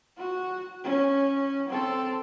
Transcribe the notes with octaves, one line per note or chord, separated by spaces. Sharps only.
F#4
C#4
C4 A4